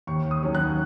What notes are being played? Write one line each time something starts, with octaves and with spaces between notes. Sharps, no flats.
D#2 C#6
D#6
D#3 F#3 C#4
F#6